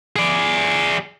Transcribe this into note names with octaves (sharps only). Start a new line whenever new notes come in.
G#4 D5